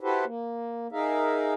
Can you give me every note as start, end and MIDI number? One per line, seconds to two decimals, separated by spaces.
0.01 0.25 64
0.01 0.25 66
0.01 0.25 67
0.01 0.25 69
0.01 0.25 71
0.01 0.25 72
0.25 0.87 58
0.92 1.54 63
0.92 1.54 68
0.92 1.54 70
0.92 1.54 76
0.92 1.54 77